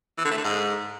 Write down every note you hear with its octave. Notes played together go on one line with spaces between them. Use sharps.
E3
D3
A3
D3
G#2